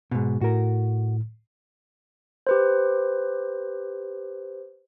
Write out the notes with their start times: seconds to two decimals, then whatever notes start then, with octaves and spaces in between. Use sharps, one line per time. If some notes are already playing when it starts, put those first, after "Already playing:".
0.11 G#2 B2
0.41 A2 F#4 A#4
2.47 G4 B4 C5